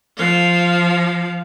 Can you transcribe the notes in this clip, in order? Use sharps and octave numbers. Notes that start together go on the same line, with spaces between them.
F3 F5